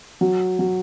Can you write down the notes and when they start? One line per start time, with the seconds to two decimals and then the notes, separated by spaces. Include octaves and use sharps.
0.21 F#3
0.59 F#3